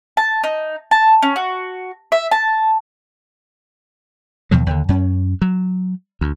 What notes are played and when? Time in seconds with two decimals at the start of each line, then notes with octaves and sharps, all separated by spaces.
0.17 A5
0.44 D#4
0.91 A5
1.22 C#4
1.36 F#4
2.12 E5
2.31 A5
4.51 D#2 B2 F3 F#3
4.66 D#2 D3
4.89 F#2 C#4
5.42 F#3
6.21 D2